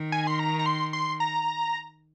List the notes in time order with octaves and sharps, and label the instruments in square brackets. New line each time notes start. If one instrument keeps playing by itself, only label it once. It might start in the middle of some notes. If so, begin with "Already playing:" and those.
Already playing: [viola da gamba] D#3
[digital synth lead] G#5
C6
A#5
A#5
C6
C6
A#5